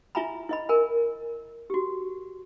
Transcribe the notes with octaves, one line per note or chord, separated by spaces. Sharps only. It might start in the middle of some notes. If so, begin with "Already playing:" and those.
E4 F4 E5 G#5 A#5 B5
E4 D#5 B5
A#4 G#5 B5
F#4 G4